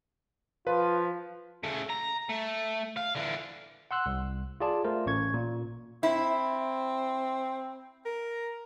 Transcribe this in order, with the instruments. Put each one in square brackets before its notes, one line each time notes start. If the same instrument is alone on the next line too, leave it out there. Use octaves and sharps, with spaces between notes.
[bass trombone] F3 [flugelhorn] F4 [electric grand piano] B4
[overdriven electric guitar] C#3 A3
A#5
A3
F5
D3 E3
[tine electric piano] F#5 C6 E6 F#6
C2
F4 G#4 D5 A5
A3 F4 A#4 C5
A1 C#4 C#6 G#6
A#2
[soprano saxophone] C4 [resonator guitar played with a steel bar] E4
[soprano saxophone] A#4